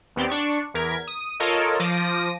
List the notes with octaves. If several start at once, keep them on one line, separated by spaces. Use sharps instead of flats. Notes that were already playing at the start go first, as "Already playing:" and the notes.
D#2 B3 C4 G4 D5
D4 C#6
E2 A#4 G#6 B6
D#6
F4 A4 A#4 C#5 D#5
F3 D6 A#6 D#7